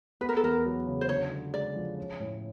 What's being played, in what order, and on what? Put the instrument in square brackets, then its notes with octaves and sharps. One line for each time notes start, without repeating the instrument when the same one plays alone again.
[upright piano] B3 [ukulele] B4
[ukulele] A#4
A4
[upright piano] E2 [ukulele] A#4
[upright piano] F#3
C#3
[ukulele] C5
[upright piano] D3 [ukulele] C#5
[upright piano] D3
[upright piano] G#3 [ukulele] D5
[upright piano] F3
C#4
A2